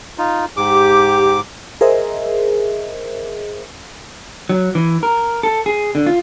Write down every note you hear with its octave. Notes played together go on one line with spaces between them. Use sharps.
D#4 F4
G#2 G4 D6
G#4 A#4 C5 D#5 E5
F#3
E3
A#4
A4
G#4
D3
F4